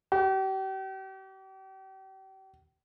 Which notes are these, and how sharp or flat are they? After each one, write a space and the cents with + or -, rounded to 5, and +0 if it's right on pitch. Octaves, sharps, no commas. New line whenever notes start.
G4 -40